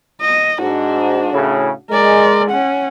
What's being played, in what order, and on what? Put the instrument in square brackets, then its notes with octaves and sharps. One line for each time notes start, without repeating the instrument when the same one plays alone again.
[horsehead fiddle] D#5
[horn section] G#2 [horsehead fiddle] D4 F#4
[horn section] A2 C#3
[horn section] G#3 [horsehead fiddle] A#4 D5
[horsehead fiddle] C#4 F#5